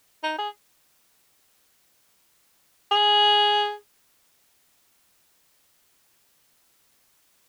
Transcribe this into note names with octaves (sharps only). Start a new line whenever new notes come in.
D#4
G#4
G#4